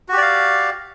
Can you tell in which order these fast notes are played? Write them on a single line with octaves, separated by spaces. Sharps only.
F#4 G4 D5 F5